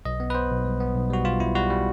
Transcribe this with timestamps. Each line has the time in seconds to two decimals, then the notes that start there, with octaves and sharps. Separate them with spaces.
0.05 B1 D#5
0.20 B3
0.30 B4
0.35 B3 C5
0.50 B1
0.65 G3
0.80 B3
0.95 B1
1.10 G3 F#4
1.25 B1 F4
1.40 B1 E4
1.55 G3 F#4
1.70 G3